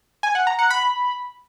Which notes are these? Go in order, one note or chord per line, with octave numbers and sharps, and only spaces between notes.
G#5
F#5
A#5
F#5
B5